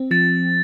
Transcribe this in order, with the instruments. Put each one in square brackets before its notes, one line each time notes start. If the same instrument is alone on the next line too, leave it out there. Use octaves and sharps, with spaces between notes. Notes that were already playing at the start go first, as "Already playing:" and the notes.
Already playing: [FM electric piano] C4
[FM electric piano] F3 [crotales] A6